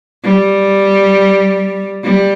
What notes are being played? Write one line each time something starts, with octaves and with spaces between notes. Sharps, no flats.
G3
G3